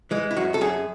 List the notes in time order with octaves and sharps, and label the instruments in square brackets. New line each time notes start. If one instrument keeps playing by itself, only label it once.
[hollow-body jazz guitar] E3 G#3
E4
F#2 F#4
A4
F#2 G#4